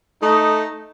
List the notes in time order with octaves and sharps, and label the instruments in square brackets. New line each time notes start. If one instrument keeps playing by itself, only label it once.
[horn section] A3 D#4